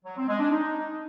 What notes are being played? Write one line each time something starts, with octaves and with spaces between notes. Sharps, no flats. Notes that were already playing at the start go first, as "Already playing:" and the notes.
F#3
C4
G#3
D4
D#4